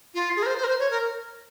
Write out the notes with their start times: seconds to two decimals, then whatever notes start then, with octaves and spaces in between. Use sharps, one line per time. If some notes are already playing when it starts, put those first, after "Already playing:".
0.15 F4
0.36 G#4
0.43 A#4
0.46 C5
0.58 C5
0.64 A#4
0.68 C5
0.79 C#5
0.90 A#4